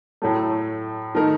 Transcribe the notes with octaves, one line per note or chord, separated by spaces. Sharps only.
A2 F#3 A3
D#3 A3 D#4 A#4